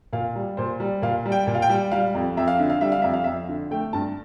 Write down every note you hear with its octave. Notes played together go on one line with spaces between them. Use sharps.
A#2 F5
G3
A#2 C5
G3
A#2 F5
G3
G5
A#2
F5
G5
G3
G3 F5
F2
F2 E5
F5
D3 E5
F5
G3 E5
F5
F2 E5
F5
F2 E5
D3
A3 G5
G2 A5